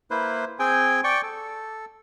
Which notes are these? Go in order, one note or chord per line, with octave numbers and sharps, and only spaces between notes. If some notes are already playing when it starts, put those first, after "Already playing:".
A#3 E4 B4 C5
C4 G#4 G5 G#5
D5 G5 C#6
A4